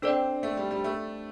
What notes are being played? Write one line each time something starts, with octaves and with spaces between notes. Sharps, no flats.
C4 D4 A4 D5 G5
A3
G3
G3
A3